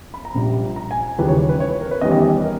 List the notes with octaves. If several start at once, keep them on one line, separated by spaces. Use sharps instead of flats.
B5
A#5
A#1 A#2 G3
A#5
G#5
D#2 C#3 E3 G3 B4
C#5
B4
C#5
B4
A#4
B4
E2 D#3 G3 C#4 D#5
D#5
D#5
A#4